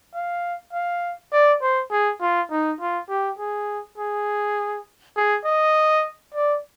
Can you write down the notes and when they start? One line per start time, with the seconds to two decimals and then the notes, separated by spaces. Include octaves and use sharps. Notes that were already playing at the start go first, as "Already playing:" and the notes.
0.14 F5
0.73 F5
1.32 D5
1.62 C5
1.91 G#4
2.21 F4
2.51 D#4
2.80 F4
3.09 G4
3.39 G#4
3.98 G#4
5.16 G#4
5.45 D#5
6.34 D5